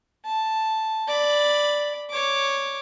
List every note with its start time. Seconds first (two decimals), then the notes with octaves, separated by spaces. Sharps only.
0.25 A5
1.08 D5 B5
2.10 C#5 D6